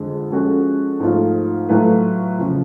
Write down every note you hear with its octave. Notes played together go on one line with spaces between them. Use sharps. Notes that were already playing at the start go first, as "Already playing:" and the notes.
Already playing: F2 D3 G#3
F3 G#3 C#4 F#4 A4
G#2 F3 A3 F4
A2 F#3 A3 F4 B4
F2 C#3 F3